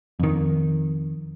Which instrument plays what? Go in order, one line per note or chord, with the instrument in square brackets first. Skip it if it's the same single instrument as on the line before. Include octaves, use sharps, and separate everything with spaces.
[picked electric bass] F2 D#3